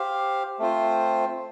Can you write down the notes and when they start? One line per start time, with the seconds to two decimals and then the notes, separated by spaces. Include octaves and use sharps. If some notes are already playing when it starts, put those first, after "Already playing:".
Already playing: G4 C5 F5
0.59 A3 C4 F4 C5